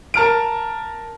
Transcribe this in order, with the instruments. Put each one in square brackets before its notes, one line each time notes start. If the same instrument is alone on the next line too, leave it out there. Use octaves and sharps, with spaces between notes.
[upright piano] A#4 A5 F6 D7